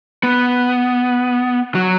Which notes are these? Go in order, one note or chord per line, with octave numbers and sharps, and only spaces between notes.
B3
F#3